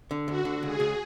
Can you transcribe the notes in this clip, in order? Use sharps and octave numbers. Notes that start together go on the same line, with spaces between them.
D3
D2 F#4
D3
C#2 G#4
C#2